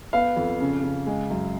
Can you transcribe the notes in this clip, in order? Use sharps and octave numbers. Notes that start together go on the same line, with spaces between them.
B3 F5
F2
C#3
C#3
G#3
F#2